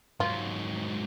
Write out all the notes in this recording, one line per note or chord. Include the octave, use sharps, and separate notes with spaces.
G#2 F#3 F4